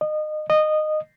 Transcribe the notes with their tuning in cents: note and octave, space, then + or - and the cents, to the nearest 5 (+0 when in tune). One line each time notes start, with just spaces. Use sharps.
D#5 -25
D#5 -15